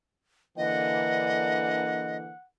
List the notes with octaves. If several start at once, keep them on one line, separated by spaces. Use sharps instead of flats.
D3 E3 A#3 D#5 F#5